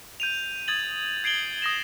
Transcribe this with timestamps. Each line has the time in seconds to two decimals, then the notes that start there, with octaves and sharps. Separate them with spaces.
0.20 G6 D#7 F7
0.68 D#6 G#6 A6 F#7
1.24 G#6 C7 D7 F#7 G7
1.62 D#6 A#6 E7